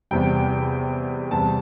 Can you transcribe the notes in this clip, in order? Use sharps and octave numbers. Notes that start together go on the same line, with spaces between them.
E2 C3 G3 G5
E2 C3 G3 A5